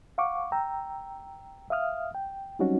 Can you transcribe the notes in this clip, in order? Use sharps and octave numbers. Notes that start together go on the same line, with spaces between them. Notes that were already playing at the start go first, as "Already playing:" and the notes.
F5 F#5 C#6 D6
G5 A#5 E6
E5 F5 D#6 F6
G5
F#3 G3 C4 C#4 D#4 F#4